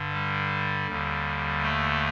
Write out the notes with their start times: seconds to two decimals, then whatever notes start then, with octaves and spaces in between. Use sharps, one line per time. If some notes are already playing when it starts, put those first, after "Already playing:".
Already playing: G2 D3
0.13 G3
0.88 D#2 D3
1.62 A3